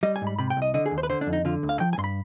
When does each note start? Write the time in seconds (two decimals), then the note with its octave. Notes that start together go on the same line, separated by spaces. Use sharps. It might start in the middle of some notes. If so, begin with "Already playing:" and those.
0.03 G3 D#5
0.16 G#5
0.22 G#2
0.27 B5
0.39 C3 B5
0.50 G5
0.57 C2
0.62 D#5
0.74 D3 D#5
0.86 G#4
0.91 D#2
0.98 C5
1.03 B4
1.10 D3 C5
1.21 D4
1.27 F2
1.33 D#4
1.45 D3 F4
1.63 D2
1.69 F5
1.80 F3 G5
1.93 G#5
1.98 G2 C6
2.04 B5